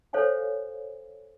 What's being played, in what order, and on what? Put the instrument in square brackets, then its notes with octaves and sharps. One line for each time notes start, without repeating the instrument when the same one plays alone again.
[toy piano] A4 C5 C#5 F5 F#5 G#5